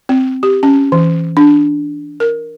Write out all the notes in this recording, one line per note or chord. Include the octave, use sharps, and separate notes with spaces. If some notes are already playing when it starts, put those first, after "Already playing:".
C4
G4
C#4
E3
D4
A#4